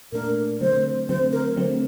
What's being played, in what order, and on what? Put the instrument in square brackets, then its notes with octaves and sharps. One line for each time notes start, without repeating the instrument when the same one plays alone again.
[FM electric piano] A#2 A3 D4 [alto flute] A#4
[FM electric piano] D3 F#3 A3 C4 [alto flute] C5
[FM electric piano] D3 F#3 A3 C4 [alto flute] C5
[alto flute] A#4
[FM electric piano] D3 F#3 A3 C4